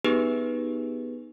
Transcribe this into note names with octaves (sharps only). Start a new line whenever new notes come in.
B3 D#4 G4 G#4 B4